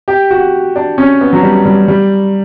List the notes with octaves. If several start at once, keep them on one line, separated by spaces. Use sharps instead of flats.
G4
F#4
D4
C#4
B3
F#3
G3
G3
G3